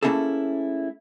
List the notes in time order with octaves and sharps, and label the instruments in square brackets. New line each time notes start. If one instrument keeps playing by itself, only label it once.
[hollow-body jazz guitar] A3 A#3 C#4 E4 G#4 A4